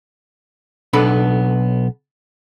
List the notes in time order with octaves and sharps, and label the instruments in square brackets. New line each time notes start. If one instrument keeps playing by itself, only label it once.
[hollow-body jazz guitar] B1 B3 D4 A4 B5